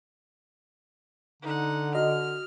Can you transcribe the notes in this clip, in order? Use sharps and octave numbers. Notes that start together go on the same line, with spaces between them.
D3 D#4 F#5
F#4 D#5 F6